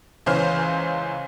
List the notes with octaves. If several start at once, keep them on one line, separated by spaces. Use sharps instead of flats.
C#2 E3 C#4 C5 F6